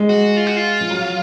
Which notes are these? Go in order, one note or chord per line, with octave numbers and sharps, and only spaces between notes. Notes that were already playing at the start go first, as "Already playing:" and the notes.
Already playing: G#3
F#4
F4
F#4
F4
F3
F#3